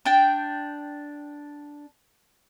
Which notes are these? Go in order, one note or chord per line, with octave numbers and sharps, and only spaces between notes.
D4 G5